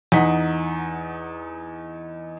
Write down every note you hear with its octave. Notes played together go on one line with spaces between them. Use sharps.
E2 D#4 F#5 B6